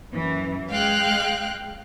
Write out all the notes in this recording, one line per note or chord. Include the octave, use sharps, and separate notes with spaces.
F#2 E3
G#3 F5 G5 F#6